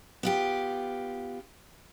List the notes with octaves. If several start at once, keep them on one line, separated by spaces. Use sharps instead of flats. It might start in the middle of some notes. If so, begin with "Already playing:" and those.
B3 F4 G4